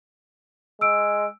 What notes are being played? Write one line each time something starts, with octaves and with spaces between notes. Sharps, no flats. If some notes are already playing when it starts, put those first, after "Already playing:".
G#3 E6 D7